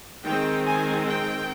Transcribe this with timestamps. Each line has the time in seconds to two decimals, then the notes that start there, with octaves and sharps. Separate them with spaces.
0.24 D#3 G#3 C4 G5
0.65 G#5
1.07 G5